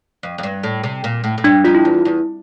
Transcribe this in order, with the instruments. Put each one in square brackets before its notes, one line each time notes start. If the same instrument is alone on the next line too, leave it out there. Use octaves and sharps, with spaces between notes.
[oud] F2
F2
G2
A2
C3
A#2
A2
A2
[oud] G2 [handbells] D4
[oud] F2 [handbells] F4
[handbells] E4
[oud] E2
E2